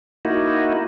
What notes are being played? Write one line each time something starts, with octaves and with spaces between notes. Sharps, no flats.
A#3 D#4 E4 F#4